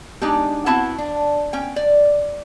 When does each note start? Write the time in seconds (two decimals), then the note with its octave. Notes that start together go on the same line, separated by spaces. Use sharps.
0.22 G#3 D4 D#4 G4
0.66 B3 C4 E4 F#4 E5 A5
0.98 D4
1.53 C#4 G5
1.76 D5